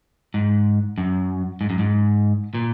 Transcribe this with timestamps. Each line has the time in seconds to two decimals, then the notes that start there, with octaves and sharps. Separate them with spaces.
0.34 G#2
0.98 F#2
1.61 G#2
1.70 F#2
1.79 G#2
2.54 A#2